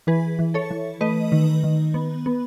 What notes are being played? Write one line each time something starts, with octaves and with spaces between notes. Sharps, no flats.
E3 G#4 B4
E3
A4 C#5
E3
A3 B4 D#5
D#3
D#3
B3
B3